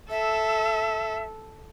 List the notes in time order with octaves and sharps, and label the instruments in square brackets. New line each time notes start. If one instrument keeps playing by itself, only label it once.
[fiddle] A4 [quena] E5